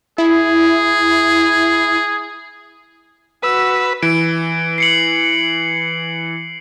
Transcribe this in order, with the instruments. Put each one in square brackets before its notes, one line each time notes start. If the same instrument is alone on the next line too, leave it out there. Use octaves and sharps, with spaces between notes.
[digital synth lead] E4 [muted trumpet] G#4
[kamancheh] F#4 E6 [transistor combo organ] B4
[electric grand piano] E3 [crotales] D7
[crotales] C7 C#7 F#7